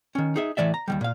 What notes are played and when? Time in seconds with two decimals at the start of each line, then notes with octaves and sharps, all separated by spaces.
0.15 D#3 C#4
0.36 D#4 G#4 E5
0.57 A2 E3 G#3 D5 E5
0.74 A#5
0.88 D#2 E3 G3
1.01 A#2 F5